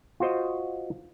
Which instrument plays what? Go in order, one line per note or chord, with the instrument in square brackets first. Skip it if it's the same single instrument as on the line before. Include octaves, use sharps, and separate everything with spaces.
[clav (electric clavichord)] F4 F#4 C5 D#5